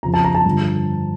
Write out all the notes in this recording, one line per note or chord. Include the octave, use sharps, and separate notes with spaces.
F2 C#3 F3 A#5
A5
A#5
A5
G2 D3 F3